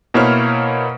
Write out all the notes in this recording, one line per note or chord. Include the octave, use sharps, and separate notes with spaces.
B2 A#3 E4 C5 C#5 F6